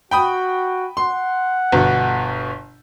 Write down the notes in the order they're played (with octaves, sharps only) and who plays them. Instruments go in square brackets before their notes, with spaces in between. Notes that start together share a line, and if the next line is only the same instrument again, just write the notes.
[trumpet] F#4 [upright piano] G5 B5 D#6
[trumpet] F#5 [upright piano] C6
[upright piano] G1 B2